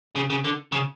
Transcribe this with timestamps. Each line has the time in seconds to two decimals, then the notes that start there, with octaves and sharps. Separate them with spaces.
0.15 C#3
0.30 C#3
0.44 D3
0.72 C#3